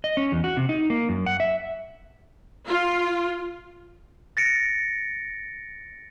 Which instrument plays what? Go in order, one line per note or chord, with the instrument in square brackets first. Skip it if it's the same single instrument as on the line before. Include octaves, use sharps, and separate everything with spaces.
[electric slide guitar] D#5
C#4
E2
F#4
C3
D#4
A#3
F#2
F#5
E5
[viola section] F4
[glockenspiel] A6 A#6 C#7 D7